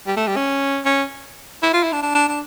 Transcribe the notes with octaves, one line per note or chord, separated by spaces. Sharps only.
G3
A3
G3
C#4
C#4
E4
F4
E4
D4
D4
D4
D4